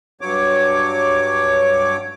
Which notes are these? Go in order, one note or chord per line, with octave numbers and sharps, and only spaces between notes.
G2 F#3 C#5 D6